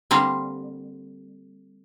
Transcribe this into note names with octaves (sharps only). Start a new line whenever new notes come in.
D3 G3 A#3 C4